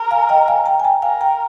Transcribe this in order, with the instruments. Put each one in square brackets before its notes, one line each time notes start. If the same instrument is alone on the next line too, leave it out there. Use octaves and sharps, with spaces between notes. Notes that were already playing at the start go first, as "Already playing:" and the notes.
Already playing: [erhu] A#4
[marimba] F5 G#5
D#5 G5
F5 G#5
G5 A#5
G#5
G5 A#5
[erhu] A#4 [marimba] F5 G#5
[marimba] G5 A#5